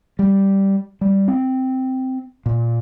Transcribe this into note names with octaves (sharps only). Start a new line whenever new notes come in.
G3
G3
C4
A#2